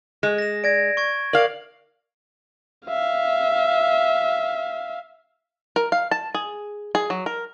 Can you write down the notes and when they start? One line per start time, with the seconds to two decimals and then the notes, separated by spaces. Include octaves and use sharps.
0.23 G#3
0.38 A#6 E7
0.64 D5 G#6 A#6 D7
0.97 C#6 G#6
1.33 A#4 D5 F5 F#7
2.87 E5 F5
5.76 A#4
5.92 F5
6.11 A5
6.35 G#4
6.95 G#4
7.10 F#3
7.26 A#4